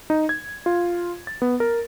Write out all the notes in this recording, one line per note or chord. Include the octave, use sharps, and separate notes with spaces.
D#4
G#6
F4
A6
B3
A#4